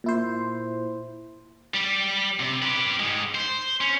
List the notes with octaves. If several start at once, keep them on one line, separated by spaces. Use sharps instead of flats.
A#2 E4 C5
G3
C3
G4 B4
G#2 G#3
C5
C#4